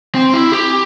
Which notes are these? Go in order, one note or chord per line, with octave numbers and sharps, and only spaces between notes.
C4
E4
G4